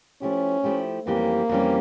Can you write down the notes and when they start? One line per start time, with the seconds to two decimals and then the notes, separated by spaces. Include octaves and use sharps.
0.22 F3 A3 C#4 E4 G4
0.64 F3 A3 E4 G4
1.07 F2 E3 G3 A#3 C#4 G4
1.49 F2 E3 G3 C#4 G4